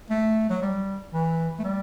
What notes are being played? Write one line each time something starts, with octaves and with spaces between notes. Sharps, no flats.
A3
F#3
G3
E3
A3
G3